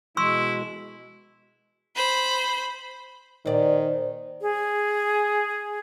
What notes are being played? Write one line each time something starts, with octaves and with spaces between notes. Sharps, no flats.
B2 G#3 E4 C6 C#6 E6
C5 B5
A#2 D#3 C5 D5
G#4